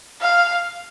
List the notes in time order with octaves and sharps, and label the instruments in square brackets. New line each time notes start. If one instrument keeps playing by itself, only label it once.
[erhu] F5